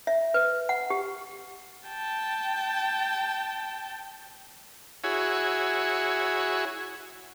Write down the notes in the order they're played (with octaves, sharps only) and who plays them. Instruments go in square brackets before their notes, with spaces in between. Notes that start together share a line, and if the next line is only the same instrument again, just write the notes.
[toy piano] E5
B4
F#5
G4
[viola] G5 A5
[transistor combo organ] E4 F#4 G#4 C#5